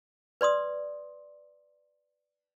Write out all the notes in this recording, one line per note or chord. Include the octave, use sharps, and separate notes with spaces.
B4 D5 C6 D#6